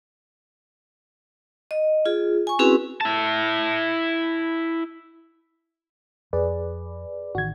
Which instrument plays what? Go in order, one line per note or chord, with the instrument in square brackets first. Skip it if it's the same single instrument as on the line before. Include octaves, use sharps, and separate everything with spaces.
[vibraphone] D#5
F4 G#4
G#5 C#6
C4 C#4 E4 F#4 G#4 B4
[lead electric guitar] E4 A5
[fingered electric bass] F2 [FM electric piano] G#4 B4 D5
[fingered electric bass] A1 D#3 [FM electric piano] F#4 G#6